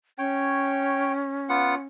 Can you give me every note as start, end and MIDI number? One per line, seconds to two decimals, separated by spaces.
0.18 1.84 61
0.18 1.13 73
0.18 1.13 79
1.49 1.75 59
1.49 1.75 65
1.49 1.75 78